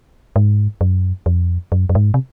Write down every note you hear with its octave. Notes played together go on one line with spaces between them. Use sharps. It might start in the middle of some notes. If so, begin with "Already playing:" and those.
G#2
F#2
F2
F#2
F#2
G#2
C3